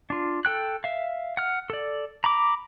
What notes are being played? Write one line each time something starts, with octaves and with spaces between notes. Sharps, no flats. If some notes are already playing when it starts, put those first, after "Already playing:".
D4 F4
A4 G5 F#6
E5 F5
F#5 F6
A4 D5
A#5 B5 D6